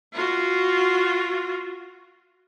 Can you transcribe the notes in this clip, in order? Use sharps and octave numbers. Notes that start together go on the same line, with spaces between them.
F4 F#4